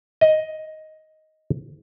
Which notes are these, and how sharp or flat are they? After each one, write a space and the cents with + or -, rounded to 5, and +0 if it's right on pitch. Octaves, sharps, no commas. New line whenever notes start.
D#5 +5